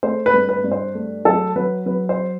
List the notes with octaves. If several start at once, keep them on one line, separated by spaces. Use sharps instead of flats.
A3 C5
B4
G2
B4
G2
C5
A3
F#3 A4
F#3 B4
F#3 B4
C5